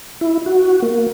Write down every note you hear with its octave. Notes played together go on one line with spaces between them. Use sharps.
E4
F#4
A#3